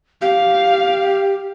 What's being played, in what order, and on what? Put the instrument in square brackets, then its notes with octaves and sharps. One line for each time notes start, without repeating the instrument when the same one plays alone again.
[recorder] G4 [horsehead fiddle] F5